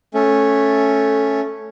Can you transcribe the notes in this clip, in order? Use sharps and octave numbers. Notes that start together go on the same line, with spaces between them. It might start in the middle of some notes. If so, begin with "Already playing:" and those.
A3 C#4